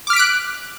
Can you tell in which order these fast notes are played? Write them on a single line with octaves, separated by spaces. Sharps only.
D6 F6 B6 D7 F#6